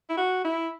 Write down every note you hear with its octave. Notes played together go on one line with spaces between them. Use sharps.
E4
F#4
E4